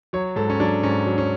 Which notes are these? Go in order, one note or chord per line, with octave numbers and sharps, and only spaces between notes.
F#3 C#5
G#2 A4
C#4
F#3 D4
G#2 C#4
F#3
C#4